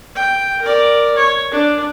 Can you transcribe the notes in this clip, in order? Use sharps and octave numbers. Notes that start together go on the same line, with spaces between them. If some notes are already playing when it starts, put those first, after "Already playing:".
G5
A#4 D5
C#5
D4